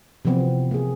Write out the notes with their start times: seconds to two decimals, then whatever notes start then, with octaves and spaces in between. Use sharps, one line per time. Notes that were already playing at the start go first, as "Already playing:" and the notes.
0.25 C3 E3 F3 B3 C4
0.71 A#3 G#4